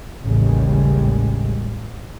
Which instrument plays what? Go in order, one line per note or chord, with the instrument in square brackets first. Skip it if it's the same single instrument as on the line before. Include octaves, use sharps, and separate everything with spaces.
[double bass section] A1 D#2 A2 C#3 G3 G#3